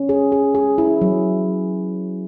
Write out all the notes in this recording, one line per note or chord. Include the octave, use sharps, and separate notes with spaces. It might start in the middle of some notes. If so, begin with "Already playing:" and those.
Already playing: C#4
G#4
G#4
G#4
E4
F#3